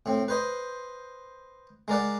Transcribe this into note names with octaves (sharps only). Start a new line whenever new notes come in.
A2 C4
B4 C5 D#5
G#3 A#4 D5 F#5